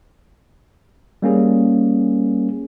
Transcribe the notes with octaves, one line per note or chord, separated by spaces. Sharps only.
G3 A#3 C#4 G#4